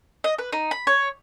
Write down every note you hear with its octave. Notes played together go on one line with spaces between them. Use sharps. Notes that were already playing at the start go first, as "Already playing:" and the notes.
D#5
B4
D#4
B5
C#5